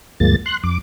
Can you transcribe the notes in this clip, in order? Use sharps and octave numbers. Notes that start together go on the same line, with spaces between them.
D2 G2 F3 G#3 A#3 A6
C6 F#6
F2 D6